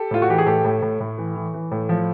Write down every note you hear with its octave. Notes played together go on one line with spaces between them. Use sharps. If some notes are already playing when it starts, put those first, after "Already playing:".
Already playing: G4 A4
A2 F4
F#4
E3 G4
G#4
A2 G4 A4
A2
A2
A2
E3
E3
E3
A2
F3